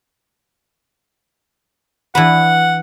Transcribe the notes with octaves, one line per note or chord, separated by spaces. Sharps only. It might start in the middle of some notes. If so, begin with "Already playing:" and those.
E3 D4 B4 F#5